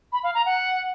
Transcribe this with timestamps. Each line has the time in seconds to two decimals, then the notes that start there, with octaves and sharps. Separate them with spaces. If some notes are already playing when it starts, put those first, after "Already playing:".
0.12 B5
0.23 F5
0.35 A#5
0.46 F#5